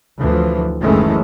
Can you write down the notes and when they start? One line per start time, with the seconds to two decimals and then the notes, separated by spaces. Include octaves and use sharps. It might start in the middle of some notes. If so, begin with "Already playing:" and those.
0.18 D2 E3 F3
0.81 F#1 D#3 E3 G#3 A3 C#4